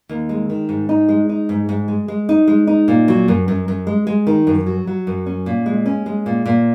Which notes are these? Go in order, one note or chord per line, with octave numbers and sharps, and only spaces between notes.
D#2
G#3
D#3
G#2
D#4
G#3
D#4
G#2
G#2
G#3
G#3
D#4
G#3
D#4
A#2
F#3
F#2
F#2
F#2
G#3
G#3
D#3
F#2
F#3
F#3
F#2
C#4
A#2
G#3
C#4
G#3
A#2
A#2